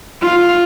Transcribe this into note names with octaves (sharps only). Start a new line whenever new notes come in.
F4